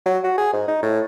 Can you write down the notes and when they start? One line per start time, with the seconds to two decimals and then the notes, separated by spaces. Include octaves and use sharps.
0.06 F#3
0.24 F#4
0.38 G#4
0.53 G#2
0.68 D#4
0.83 A2